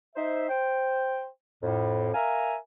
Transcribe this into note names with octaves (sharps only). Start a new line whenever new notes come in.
D#4 C5 E5
C5 G5
F2 A2
A#4 E5 F5 G#5 A#5